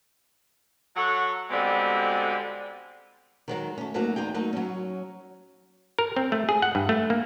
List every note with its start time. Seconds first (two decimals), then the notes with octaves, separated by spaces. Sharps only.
0.96 F#3 A4 C#5 F#5
1.51 B2 D3 G3 G#3 C4
3.48 D#3 F#3 G#3
3.78 A3 C#4
3.94 F#3 A3 A#3 C#4 D#4 F#4
4.16 E2 D#4 G#4 G5
4.34 F#3 A3 A#3 D#4 F#4
4.53 F#3 C#4
5.99 A#4
6.16 C4
6.32 A3
6.49 G#4
6.62 F#5
6.75 G2
6.89 A3
7.10 A#3